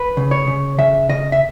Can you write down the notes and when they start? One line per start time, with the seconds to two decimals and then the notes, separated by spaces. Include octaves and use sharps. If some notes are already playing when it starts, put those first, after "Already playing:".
Already playing: B4
0.17 C#3
0.31 C#5
0.47 C#3
0.78 C#3 E5
1.10 C#3 D#5
1.32 E5